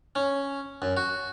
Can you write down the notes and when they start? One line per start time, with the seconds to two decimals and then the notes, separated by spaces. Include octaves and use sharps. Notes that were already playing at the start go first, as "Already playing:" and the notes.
0.15 C#4
0.82 F#2
0.97 F#4